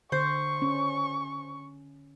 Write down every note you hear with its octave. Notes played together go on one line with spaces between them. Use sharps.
D3 C5 C#6
C#4